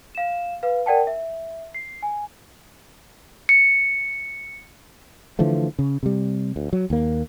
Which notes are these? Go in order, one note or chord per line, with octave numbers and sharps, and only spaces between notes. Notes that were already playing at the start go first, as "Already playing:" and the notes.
F5 E7
B4 F5
A#4 D5 F#5 G5 A5
E5
C7
G#5
C#7
D3 E3 F3 A3
C#3
C3 G3
D2
F#3
D#2 A#3